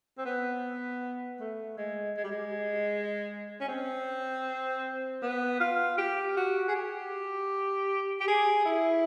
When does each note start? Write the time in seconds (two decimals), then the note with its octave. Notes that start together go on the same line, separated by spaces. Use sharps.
0.18 C4
0.25 B3
1.40 A3
1.77 G#3
2.17 G#3
2.24 G3
2.31 G#3
3.61 C#4
3.68 C4
5.22 B3
5.60 F4
5.98 G4
6.37 F#4
6.68 G#4
6.75 G4
8.20 G4
8.27 G#4
8.65 E4